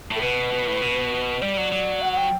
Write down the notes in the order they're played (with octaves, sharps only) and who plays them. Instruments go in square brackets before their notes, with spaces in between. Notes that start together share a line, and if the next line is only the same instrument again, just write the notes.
[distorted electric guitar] A2 [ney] A4
[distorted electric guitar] B2 [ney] B4
[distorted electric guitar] B2
A2
B2
[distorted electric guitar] G3 [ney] D5
[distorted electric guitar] F#3
F#3
[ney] F#5
F#5
G5